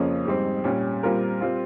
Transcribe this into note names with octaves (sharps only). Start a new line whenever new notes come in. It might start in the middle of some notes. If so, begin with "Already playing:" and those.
Already playing: F2 C#3 F3 A#3 C#4
G#2 G3 C4
A#2 G3 C#4
A#2 G3 C4 F4 A#4
G3 C4 F4